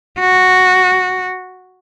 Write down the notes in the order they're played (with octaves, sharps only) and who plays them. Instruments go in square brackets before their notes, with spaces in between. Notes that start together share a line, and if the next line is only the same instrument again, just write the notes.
[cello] F#4